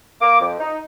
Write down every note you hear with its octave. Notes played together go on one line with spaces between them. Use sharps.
A#3 D6
F2
D#4